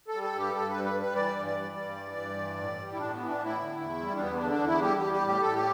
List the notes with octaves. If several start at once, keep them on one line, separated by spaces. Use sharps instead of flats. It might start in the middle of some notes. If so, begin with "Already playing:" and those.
A4
G3
A4
G2
G4
G2 A4
B4
G3
B4
G3
B4
E3 D5
G2
D5
G3
G2
E3
G2
E3
A2
G3
E4
A2 D4
B3
E3
D4
A2 E4
D3
E2
G3
D4
E2 B3
D4
D3
D4
E2 E4
G3 G4
G3 G4
G4
A2 G4
A2 A4
G4